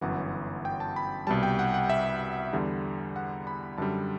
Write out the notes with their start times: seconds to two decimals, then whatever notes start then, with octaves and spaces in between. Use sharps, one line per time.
0.01 G1 F#2 E3 F#5
0.65 G5
0.80 A5
0.96 B5
1.27 C2 B2 G3 A5
1.43 G5
1.59 F#5
1.74 F#5
1.90 E5
2.53 E2 D3 G3
3.16 F#5
3.47 B5
3.78 F#2 D3 G3 A5